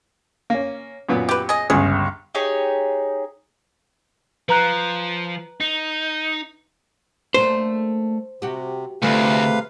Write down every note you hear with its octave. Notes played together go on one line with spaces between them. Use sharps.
A#3 C#4
F#2 A#2 B3
G4 B4
G#4 D#5
G1 C#2 G#4
D#4 G4 G#4 C#5
F3 B4 A#5 F#6
D#4
A3 A#3 D4 C5
C3 F#4 G4
D2 C3 A3 F4 G#4 B4 F5